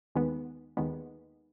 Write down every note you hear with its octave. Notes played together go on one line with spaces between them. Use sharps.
D#2 D#3 G#3 B3
D#2 D#3 G#3 B3